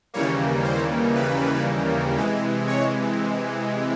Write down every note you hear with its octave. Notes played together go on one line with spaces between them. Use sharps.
D#2 C#3 E3 G3 A#3 C#5
C5
B4
C3 E3 G#3
C#5